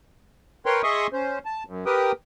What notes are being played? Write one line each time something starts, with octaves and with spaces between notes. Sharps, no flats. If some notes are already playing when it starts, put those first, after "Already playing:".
A#4 B4 C#5 G5 C6
G#4 D#5 E5 C6 C#6 D#6
C#4 C5
A5
F#2
G4 A#4 B4 G5 D#6